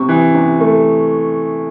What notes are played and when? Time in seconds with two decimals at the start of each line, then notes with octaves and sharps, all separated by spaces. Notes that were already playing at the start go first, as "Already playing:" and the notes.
Already playing: C3 C#6
0.09 E3
0.35 C3
0.60 A3